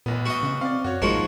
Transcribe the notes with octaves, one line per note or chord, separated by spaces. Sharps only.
A1 A#2 B3
F#4 D#5
C#3
C4 D5 F5
F#2 F#4 C#5
A1 G#2 F3 A#3 F#4